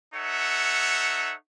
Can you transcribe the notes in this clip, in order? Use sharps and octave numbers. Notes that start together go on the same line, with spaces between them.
D#4 A4 C#5 E5 F#5